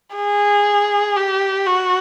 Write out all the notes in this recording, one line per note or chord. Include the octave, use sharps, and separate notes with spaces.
G#4
G4
F#4